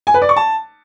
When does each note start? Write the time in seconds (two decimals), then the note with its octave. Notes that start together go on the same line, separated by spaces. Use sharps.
0.07 G#5
0.14 B4
0.22 D5
0.29 C#6
0.36 A5